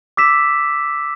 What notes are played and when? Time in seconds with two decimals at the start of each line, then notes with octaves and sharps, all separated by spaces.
0.17 D6 E6 B6 E7